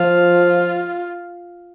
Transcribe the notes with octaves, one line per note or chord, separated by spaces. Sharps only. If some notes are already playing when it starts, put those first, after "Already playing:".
Already playing: F3 F4